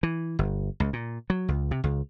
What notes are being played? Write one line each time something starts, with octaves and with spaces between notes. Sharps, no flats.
E3
G1
C#2
A#2
F#3
C#2
C3
C#2